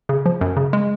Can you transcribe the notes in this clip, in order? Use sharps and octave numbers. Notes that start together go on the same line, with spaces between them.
C#3
F3
F#2
C#3
G#3